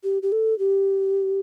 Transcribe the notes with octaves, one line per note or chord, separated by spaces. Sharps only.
G4
G4
A4
G4